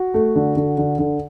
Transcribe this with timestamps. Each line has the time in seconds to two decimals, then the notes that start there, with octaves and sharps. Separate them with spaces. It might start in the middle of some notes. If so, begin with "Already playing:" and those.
Already playing: F#4
0.14 A3
0.35 D3
0.57 D3
0.78 D3
0.99 D3